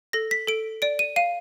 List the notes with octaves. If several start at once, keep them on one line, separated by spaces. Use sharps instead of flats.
A4 A#6
B6
A4 D7
D5 D7
D#7
F5 D#7